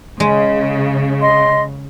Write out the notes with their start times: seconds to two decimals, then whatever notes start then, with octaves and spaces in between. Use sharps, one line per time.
0.20 C#3 G#3
1.22 D#5 C6